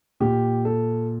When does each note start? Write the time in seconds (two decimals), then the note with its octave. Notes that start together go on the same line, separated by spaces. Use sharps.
0.20 A#2 G4
0.65 A4